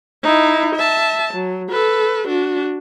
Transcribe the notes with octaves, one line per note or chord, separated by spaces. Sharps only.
D#4 E4
E5 A5
F#3
A4 B4
D4 F#4